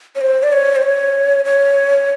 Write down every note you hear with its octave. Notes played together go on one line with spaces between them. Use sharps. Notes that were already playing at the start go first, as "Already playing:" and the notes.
C#5
C5
D5
C#5
C5
C#5
C#5